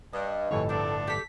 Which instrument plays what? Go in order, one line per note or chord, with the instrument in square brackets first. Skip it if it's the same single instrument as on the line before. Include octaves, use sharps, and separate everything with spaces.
[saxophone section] G2 [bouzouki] D#5
[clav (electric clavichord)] G1 F2 A2 [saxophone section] E3 C#5 [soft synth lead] A4
[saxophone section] A3 B3 D4 [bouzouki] C4 A#4
[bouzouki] G4 A4 D5 [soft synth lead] B6